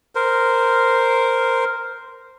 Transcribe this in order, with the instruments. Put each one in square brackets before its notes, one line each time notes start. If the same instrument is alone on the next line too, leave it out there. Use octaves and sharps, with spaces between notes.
[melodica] A#4 C5